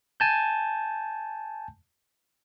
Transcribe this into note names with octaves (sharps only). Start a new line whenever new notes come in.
G#5 A5 G6